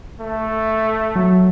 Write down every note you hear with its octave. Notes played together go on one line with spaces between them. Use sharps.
A3
F#3